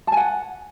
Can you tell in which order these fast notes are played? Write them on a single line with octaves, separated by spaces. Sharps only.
A5 G#5 F#5